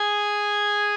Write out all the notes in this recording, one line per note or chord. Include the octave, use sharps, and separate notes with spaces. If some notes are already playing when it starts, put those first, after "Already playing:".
Already playing: G#4 G#5